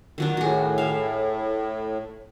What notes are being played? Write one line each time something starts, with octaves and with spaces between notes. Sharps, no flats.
D#3 F#3 D4
A2 F#4 G#4
E5 F5